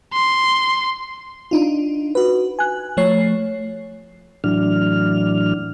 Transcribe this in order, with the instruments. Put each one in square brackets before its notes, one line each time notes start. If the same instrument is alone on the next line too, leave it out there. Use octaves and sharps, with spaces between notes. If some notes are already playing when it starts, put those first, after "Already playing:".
[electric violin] C6
[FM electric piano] D4 D#4 F4
F#4 B4
G#5 F#6
F3 A3 C#5 C7
[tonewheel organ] A2 E3 F#3 D4 F6